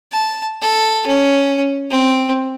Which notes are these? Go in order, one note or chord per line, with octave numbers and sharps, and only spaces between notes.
A5
A4
C#4
C4